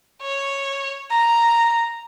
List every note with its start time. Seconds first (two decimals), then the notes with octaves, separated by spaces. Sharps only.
0.22 C#5
1.10 A#5